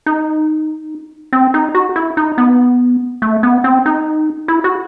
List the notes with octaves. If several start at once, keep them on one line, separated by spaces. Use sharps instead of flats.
D#4
C4
D#4
F#4
E4
D#4
B3
A3
B3
C4
D#4
E4
F#4